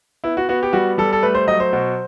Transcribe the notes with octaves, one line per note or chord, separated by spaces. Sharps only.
B3 E4
F#4
B3 F#4
G4
G3 F#4
G3 A4
A4
A3 B4
C5
F#3 D#5
C5
B2